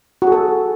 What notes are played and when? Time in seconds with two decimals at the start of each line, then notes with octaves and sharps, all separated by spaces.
0.22 F#4
0.27 G#4
0.32 A4